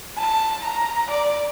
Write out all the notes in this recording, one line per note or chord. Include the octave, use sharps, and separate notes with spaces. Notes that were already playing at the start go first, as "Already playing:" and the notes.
A5
A#5
D5